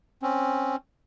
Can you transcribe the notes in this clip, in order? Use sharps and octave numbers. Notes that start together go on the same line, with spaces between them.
C4 C#4